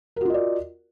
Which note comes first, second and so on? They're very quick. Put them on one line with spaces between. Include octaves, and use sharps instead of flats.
A#4 F#4 F4 D#5 D5